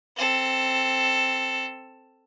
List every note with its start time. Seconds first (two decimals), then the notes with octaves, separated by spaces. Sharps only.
0.16 C4 A4